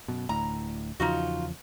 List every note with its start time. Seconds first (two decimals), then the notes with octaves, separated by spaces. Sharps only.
0.08 F#2 B2
0.29 D1 D2 A2 A#5
1.00 E2 C#3 F3 D#4 F4 F#4